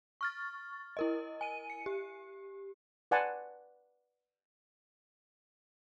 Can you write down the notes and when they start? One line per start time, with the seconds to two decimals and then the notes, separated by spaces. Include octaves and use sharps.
0.21 C#6 F6 A6
0.97 E4 A#4 D#5
1.41 G#5 D#7
1.70 C#7
1.86 G4
3.11 B4 D5 F#5 G#5 A5 C6